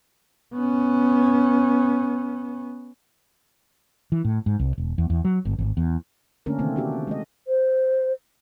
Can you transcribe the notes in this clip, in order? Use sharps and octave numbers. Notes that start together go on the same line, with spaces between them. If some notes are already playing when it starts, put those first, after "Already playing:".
B3 C#4
E3
A2
G#2
C2
E1
E2
E2
F#3
G1
G#1
E2
D3 A3 A#3 C#4 D4 A#4
C3 D#3 E3 A3 A#3 C4
D4 F#4 G4
B3
G#3 A3 D#5
C5